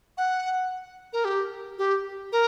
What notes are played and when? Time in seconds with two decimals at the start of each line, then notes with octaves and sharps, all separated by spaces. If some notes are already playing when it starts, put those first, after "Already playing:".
0.18 F#5
1.13 A#4
1.25 G4
1.78 G4
2.32 A#4